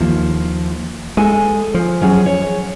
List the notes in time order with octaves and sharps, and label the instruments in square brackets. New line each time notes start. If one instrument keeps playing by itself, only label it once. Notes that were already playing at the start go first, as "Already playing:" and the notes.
[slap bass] D#2 [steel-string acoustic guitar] F3
[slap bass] G#3 [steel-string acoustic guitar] A4 G#5
[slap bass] F3
[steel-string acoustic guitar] F#3 C#4 G#4
C#5